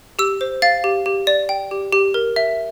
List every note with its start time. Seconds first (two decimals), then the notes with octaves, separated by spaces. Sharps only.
0.19 G4 E6
0.41 C5
0.62 F5 A6
0.84 G4
1.06 G4
1.27 D5
1.49 G5
1.71 G4
1.93 G4
2.14 A#4
2.36 E5